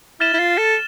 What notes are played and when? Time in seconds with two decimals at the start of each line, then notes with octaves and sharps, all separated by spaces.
0.20 E4 F6 A6 E7 G7
0.34 E4
0.39 F4
0.58 A4